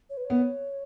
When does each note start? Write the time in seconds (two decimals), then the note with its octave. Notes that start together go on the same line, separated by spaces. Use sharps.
0.10 C#5
0.17 B4
0.25 C#5
0.30 B3